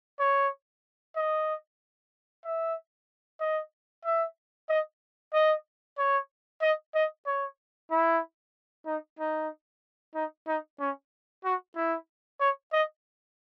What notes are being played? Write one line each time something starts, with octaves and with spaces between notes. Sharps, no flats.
C#5
D#5
E5
D#5
E5
D#5
D#5
C#5
D#5
D#5
C#5
E4
D#4
D#4
D#4
D#4
C#4
F#4
E4
C#5
D#5